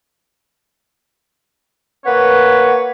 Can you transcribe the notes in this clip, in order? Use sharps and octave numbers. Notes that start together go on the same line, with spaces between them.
A#3 B4 C#5 F#5